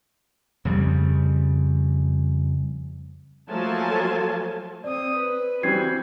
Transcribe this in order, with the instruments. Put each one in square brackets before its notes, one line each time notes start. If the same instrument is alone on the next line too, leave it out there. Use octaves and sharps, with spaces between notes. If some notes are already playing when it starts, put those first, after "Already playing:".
[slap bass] F2 C#3 G3
[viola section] F3 F#3 A3 A#3 G#5 A5
[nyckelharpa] C4 D#6 [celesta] D5
[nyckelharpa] B4
[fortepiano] E3 G3 C4 [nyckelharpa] F#4 [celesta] G#6 C7